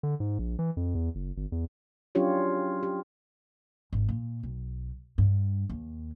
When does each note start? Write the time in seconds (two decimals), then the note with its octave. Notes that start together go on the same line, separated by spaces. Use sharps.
0.03 D3
0.20 G#2
0.39 A#1
0.59 E3
0.77 F2
0.95 E2
1.15 F#1
1.37 G1
1.52 E2
2.15 F#3 C#4 D4 F4 G4 C#5
2.83 G4
3.93 G#1
4.08 A#2
4.43 B1
5.18 G2
5.70 D#2